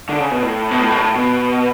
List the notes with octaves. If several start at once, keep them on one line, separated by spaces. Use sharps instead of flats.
D3
C#3
B2
A2
B2
A2
B2
A2
B2